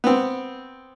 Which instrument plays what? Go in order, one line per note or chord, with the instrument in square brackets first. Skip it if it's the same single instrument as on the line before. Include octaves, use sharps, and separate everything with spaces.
[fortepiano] B3 C4